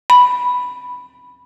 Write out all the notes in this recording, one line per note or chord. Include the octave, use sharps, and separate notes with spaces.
B5